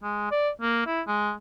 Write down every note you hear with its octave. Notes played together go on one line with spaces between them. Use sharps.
G#3
D5
A#3
E4
G#3